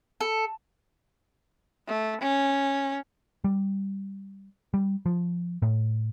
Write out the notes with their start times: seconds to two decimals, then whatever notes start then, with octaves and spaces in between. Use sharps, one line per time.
0.21 A4
1.88 A3
2.21 C#4
3.44 G3
4.74 G3
5.06 F3
5.62 A2